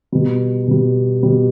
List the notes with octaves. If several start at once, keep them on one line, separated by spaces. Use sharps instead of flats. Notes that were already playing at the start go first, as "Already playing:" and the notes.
B2 G3
B2 G3
B2 G3